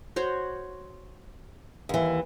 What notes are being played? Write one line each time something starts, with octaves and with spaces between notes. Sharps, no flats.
F#4 C5 C#5
D#2 E3